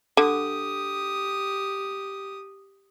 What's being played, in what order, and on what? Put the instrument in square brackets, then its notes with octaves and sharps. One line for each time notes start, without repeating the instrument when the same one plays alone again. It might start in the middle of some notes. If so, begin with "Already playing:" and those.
[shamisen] D3 [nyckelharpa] G4 D#6